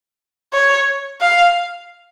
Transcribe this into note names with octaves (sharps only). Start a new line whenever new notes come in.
C#5
F5